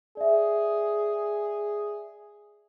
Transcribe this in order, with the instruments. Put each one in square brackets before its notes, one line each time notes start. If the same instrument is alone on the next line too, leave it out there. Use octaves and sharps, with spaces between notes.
[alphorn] G#4 [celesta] D5 E5